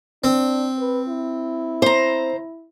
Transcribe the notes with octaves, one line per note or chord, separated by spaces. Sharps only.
C4 D4
B4
E4
C5 A#5